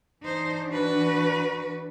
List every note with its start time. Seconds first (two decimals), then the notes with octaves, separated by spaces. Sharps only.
0.22 E3 D4 D#4 C5
0.70 F#4 B4